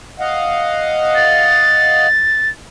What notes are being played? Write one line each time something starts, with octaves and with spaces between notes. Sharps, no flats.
D#5 F5 F#5
A6